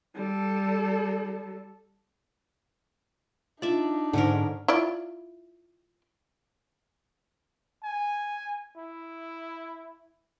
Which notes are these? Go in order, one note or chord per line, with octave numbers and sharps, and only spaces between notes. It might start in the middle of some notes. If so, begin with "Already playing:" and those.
G3 A4
D4 D#4 F4 D5 E5
G#2 D3 C#4 A#4
E4 F4 D5
G#5
E4